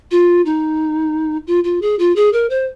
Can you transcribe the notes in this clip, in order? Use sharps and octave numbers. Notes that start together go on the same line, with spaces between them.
F4
D#4
F4
F4
G#4
F4
G#4
A#4
C5